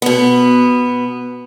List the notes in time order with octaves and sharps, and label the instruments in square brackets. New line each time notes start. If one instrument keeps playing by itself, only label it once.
[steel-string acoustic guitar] B2 B3